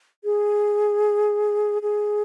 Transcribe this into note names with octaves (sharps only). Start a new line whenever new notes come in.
G#4
G#4